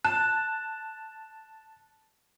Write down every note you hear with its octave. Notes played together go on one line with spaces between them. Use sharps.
A5 F#6